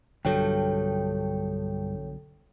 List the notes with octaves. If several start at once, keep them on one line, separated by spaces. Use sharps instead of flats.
B1 G2 D3 F#3 A4 C#5 G5